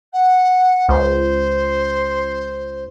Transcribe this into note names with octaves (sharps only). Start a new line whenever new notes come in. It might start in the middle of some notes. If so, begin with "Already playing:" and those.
F#5
C#2 C5